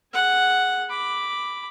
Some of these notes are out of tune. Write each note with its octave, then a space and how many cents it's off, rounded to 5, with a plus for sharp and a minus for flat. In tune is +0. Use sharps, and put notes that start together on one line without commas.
G#4 +0 F#5 +0
B5 +0 D6 +0